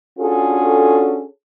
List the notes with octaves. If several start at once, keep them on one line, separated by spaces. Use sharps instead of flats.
C#4 D4 F4 F#4 G#4 A4